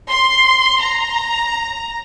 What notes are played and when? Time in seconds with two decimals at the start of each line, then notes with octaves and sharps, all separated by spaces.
0.11 C6
0.82 A#5